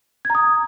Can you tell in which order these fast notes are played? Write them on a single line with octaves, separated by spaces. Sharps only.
G#6 A#5 D#6